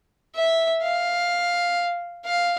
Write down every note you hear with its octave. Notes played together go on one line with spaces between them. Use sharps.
E5
F5
F5